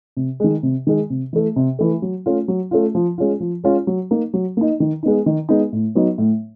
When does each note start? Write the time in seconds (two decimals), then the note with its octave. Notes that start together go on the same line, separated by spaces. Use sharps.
0.17 C3
0.40 D#3 G#3
0.63 C3
0.87 D#3 G#3
1.10 C3
1.33 E3 A3
1.56 C3
1.79 E3 A3
2.02 F#3
2.26 A3 C#4 F4
2.48 F#3
2.71 A3 C#4 F4
2.95 F3
3.18 G#3 C#4 F4
3.40 F3
3.64 G#3 C#4 F4
3.87 F#3
4.11 A#3 D#4
4.34 F#3
4.57 A#3 D#4
4.80 D#3
5.03 G#3 B3 D#4
5.26 D#3
5.49 G#3 B3 D#4
5.73 A2
5.95 F#3 B3 D#4
6.18 A2